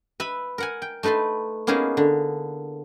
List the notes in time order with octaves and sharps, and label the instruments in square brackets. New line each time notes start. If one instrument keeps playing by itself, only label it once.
[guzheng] B4 E5 B5
A#4 F#5 G#5
G5
A3 D#4 B4 A5 C6
A#3 B3 C#4 D#4 E4 G#4
D3